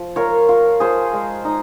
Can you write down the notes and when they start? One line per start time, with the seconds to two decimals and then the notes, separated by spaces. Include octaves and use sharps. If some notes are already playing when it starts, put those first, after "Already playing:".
Already playing: F3
0.16 F4 A#4 C#5
0.49 F4
0.80 F3 G#4 C5
1.13 G#3
1.45 D#4